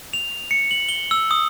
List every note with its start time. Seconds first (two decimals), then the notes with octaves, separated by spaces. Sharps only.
0.13 F7
0.51 C#7
0.71 F#7
0.89 G7
1.11 E6
1.31 D#6